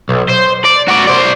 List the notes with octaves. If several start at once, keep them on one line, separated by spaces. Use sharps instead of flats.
B1
C5
D5
F#4 D5
C5 D5